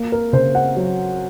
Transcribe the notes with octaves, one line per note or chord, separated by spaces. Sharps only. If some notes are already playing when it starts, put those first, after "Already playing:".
Already playing: A#3
A#4
C#3 C5
F#5
F#3